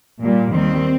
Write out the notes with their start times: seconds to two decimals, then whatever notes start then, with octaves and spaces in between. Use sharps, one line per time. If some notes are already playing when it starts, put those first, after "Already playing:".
0.21 A#2 G3
0.53 D#2 D#3 G3 C4